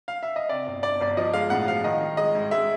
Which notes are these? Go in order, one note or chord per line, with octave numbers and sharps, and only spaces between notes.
F5
E5
D#5
C3 D5
G1
G1 D5
G1 D5
F3 D#5
G#3 F5
A2 F#5
F3 F5
D#3 D#5
D#3
G#3 D#5
G#2
G#3 E5